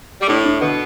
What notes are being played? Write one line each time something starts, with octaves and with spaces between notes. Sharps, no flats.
G3
A2 A3 D4
D4
B2 D3 B3